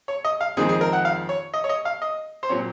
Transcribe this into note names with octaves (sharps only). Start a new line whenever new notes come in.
C#5
D#5
F5
F2 D#3 G#3 C4 G#4
G#4
A#4
F#5
F5
C#5
D#5
C#5
D#5
F5
D#5
C5
A#2 F#3 C4 C#5